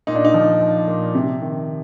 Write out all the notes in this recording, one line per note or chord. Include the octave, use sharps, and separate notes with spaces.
A#2 D#4
D4
D#4
F3
F3
A#2
C3
D#3